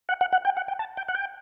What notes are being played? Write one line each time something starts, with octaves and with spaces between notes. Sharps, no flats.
F#5
F#5
F#5
G5
F#5
G5
A5
G5
F#5
G5